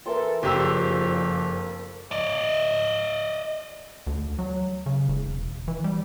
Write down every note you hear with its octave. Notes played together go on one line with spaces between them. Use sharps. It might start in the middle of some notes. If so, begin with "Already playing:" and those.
E3 A4 A#4 A5 C6
F#1 F2 F3 G4 D5 E6
D5 D#5
D2
F#3
C#3
E1
E3
G3